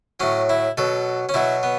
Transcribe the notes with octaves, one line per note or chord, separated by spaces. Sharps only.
A2 F#3 C#4
E4
B2 F#3 A4
C#4
B2 F#3 E4
B3